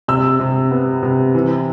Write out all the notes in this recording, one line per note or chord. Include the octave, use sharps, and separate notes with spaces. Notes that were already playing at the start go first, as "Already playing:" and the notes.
C3 E6
C3
B3
C3
E3